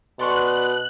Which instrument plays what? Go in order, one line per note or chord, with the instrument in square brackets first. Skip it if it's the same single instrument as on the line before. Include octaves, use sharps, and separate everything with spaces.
[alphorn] B2 [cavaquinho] D5 C6 C#6 [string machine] F#6